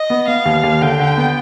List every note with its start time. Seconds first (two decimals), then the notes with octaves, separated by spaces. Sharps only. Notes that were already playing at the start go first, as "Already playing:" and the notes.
Already playing: D#5
0.10 B3
0.27 B3 F5
0.45 D#2
0.63 D#2
0.82 D3 G5
1.00 D3
1.17 B3